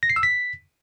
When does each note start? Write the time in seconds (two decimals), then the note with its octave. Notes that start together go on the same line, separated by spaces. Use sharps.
0.03 A#6
0.10 C7
0.16 E6
0.23 B6